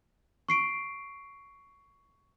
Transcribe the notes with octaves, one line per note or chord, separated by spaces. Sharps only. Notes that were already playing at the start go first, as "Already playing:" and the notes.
C#6 C7 D7